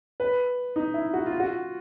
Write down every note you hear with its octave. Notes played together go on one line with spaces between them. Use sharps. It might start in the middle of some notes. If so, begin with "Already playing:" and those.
B4
D#4
E4
F#4
F4
F#4